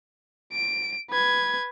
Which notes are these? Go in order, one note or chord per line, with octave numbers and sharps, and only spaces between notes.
D7
B4 G#6